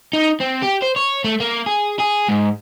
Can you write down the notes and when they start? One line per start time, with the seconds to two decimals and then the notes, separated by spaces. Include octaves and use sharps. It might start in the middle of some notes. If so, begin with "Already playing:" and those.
0.13 D#4
0.41 C4
0.63 G4
0.82 C5
0.96 C#5
1.24 A3
1.40 A#3
1.66 G#4
2.00 G#4
2.29 G#2